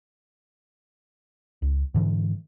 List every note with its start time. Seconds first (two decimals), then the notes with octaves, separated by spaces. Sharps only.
1.62 C#2
1.94 G#2 D3 E3